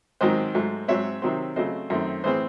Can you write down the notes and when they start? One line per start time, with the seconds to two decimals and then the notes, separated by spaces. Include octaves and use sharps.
0.21 G#2 D#3 F#3 C4 C5 D#5
0.55 G#2 F#3 A3
0.88 G#2 F#3 C4 C#5 E5
1.22 C3 D#3 F#3 C4
1.56 C#3 F#3 A3 C4 C5 D#5
1.90 F#2 D#3 A3 C4
2.24 A2 E3 C4 G#4 C5